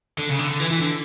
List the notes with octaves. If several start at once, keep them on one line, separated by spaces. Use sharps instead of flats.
D3
C#3
D3
D3
E3
E3
D3